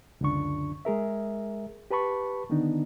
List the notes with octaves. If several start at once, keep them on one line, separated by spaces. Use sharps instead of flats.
C#2 F#2 D3 D4 C#6
G#3 G#4 A#4 E5
G4 B4 A5 B5 C#6
D3 D#3 B3 D4 D#4